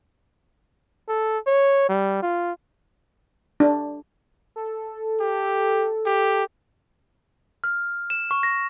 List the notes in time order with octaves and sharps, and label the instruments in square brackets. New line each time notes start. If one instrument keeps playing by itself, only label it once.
[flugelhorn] A4
C#5
G3
F4
[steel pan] D4
[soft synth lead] A4
[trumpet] G4
G4
[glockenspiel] F6
E7
C#6
A#6